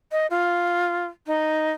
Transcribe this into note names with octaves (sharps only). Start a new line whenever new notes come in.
D#5
F4
D#4